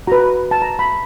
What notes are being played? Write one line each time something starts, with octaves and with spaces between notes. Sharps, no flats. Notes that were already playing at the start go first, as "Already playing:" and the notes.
F#4 B4 A#5
A5
A#5
B5